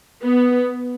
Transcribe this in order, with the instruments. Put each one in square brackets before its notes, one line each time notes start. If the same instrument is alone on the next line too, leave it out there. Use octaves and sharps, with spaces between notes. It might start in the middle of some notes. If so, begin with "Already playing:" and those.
[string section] B3